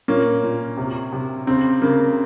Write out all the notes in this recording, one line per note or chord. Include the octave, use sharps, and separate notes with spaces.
A#2 A#3 C#4
A#2
C3
C3
C#3 C4
C#3 A#3